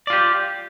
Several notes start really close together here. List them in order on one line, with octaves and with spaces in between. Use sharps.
D5 F4 G4